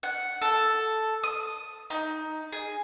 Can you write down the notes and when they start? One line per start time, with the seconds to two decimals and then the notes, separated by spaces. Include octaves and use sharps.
0.03 F#5
0.42 A4
1.23 D#6
1.90 D#4
2.52 G#4